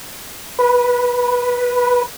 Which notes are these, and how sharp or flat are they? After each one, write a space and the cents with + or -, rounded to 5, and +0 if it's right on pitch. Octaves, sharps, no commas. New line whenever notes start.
B4 -15